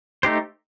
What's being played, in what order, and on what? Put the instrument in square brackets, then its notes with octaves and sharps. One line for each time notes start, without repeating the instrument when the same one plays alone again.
[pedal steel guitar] A3 D#4 G4 C5